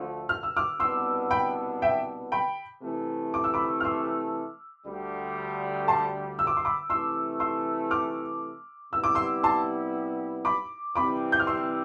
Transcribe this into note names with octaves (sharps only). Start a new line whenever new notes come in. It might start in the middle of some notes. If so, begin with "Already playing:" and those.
Already playing: D2 D3 F3 A3
F6
E6
D6 F6
C2 B2 B3 D4 C6 E6
G5 B5
E5 G5
G5 B5
C3 E3 A3
D6
E6
B5 D6
F6
C6 E6
D2 D3 G3
A5 C6
E6
D6
C6
B5 D6
C3 E3 A3 C6 E6
C6 E6
D6 F6
C3 G3 B3 E4 E6
D6
C6 E6
A5 C6
B5 D6
C3 E3 G3 C4 B5 D6
G6
F6
C6 E6